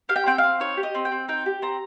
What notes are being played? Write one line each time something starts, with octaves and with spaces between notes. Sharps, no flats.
G4 F5
G5
C4 G5
F5
C4
D#4 C#5
G4
D#5
C4
G5
C4
D#4 G5
G4
C4 A#5